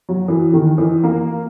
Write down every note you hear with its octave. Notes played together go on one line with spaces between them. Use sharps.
F#3
E3
D#3
E3
A#3